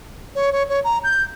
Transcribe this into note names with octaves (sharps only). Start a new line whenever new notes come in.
C#5
C#5
C#5
A#5
G6